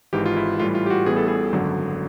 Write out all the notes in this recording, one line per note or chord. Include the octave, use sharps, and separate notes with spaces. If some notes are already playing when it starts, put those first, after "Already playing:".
G#1 G#2 E3 G4
F4
E4
A2 E3 G3 F4
F4
G4
F#4
A1 A2 E3 G3 B3 G#4
A4
G#4
G#1 F#2 D3 F#3